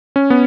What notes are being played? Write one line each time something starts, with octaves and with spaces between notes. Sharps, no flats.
C#4
B3